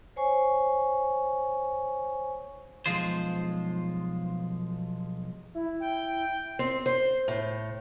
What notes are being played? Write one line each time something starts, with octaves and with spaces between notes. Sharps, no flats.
C5 C#5 G#5 C#6
B1 F#2 F3 G#3 F4 C5
E4
G5
C4
C5
A2